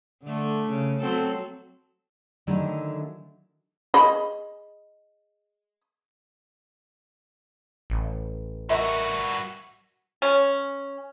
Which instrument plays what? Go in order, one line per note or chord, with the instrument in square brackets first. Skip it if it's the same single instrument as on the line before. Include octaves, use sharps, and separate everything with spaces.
[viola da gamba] D3 A3
C#3
F#3 C4 A4
[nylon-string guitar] D3 D#3 F#3 A3 E4 G#4
[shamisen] G#4 D#5 B5
[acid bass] A1
[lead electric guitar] G2 F#4 [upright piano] A#4 E5
[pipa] C#4